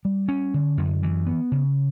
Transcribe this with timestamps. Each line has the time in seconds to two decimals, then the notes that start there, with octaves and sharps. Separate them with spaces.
0.05 G3
0.28 C#4
0.54 D3
0.77 F#2
1.03 E3
1.27 B3
1.52 C#3